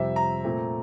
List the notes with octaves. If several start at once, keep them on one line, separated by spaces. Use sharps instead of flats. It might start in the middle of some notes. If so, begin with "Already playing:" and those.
Already playing: F2 C3 G3 C4 E5
A#5
A#2 A3 C4